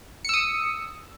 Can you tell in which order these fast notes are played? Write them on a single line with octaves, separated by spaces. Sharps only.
C#7 E6 D#6